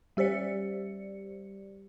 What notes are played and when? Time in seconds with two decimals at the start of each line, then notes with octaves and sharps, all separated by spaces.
0.17 G3 G4 C5 D5 C#7